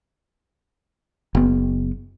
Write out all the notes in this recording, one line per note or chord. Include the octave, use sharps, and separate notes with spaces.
F#1 B3